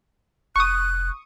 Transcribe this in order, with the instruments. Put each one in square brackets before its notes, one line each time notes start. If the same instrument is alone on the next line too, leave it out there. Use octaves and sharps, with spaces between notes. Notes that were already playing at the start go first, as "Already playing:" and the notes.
[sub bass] F1 [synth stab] C#6 D#6 [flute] F#6